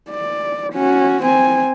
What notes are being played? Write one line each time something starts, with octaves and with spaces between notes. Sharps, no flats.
D5
C#4 F#4
C4 G#5